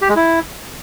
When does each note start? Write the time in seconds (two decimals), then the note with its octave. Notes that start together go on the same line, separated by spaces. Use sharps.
0.02 G4
0.09 G#3
0.16 E4